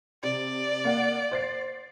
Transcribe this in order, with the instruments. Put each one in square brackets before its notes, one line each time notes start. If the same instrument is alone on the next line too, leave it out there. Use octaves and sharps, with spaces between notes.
[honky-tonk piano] C3 [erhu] D5
[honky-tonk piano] A#3 F#5
C5 A6 C7